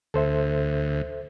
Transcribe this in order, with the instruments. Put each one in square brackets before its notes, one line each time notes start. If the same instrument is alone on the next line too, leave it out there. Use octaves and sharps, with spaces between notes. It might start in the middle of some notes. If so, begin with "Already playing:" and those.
[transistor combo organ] D2 [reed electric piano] A4 C5 E5